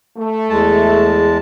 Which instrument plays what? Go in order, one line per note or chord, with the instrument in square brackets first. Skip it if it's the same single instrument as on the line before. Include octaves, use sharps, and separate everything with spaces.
[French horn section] A3
[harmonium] E2 G#3 A5